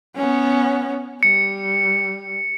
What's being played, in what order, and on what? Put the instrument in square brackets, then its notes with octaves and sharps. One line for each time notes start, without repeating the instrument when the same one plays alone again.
[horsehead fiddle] B3 C#4
[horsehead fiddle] G3 [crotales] C#7